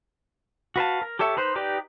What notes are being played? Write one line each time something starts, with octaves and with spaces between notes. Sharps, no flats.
F#4 B4 F5 A5
A#4
G4 A4 C#5 E5
D#4 B4 C5
D#4 G4 B4 D5